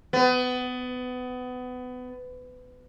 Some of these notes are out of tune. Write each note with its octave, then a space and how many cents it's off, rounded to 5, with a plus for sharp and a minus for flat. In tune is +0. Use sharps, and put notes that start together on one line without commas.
B3 +25